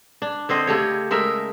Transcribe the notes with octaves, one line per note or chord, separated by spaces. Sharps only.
D4
D3 C4 C5 D#5
C#3 A3 G4 C#5
G#3 A3 A#4 E5